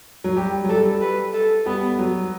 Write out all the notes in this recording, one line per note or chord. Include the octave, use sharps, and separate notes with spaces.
F#3
G3 G4
F#3
G3 A4
B4
A4
G3 B3
F#3